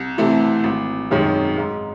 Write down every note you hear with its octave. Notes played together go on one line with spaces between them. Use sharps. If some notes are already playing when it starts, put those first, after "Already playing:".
Already playing: C2
C3 E3 A3
G#1
F#2 D#3 G#3 C#4
G#2